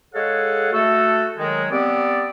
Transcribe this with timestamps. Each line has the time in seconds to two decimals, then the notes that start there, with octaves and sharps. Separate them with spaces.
0.14 G#3 G#4 A4 C#5 F5 F#5
0.72 A3 F#4 A4
1.38 D#3 F#3 G#3
1.71 G3 B3 C4 D5